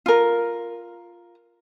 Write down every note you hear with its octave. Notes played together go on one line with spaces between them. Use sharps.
F4 A#4